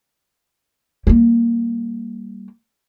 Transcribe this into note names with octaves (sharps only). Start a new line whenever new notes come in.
G3 A#3